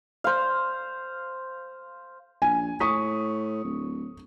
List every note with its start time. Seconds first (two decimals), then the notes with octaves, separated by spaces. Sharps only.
0.24 C5 F5
2.42 A#1 G#5
2.80 A2 C#6 D#6 B6
3.64 D1